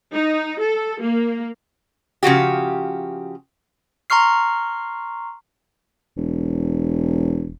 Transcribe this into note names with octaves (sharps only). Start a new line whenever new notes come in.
D#4
A4
A#3
C#3 F3 F#4 G4
A#5 C6 C#6 F6 C7
E1